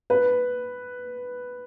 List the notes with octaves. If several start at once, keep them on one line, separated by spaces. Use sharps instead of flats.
B4